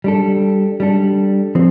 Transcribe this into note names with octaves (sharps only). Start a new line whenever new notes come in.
G3 D4 A4
G3 D4 A4
F3 C4